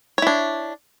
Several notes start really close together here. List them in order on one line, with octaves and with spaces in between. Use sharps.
C#5 E4 D4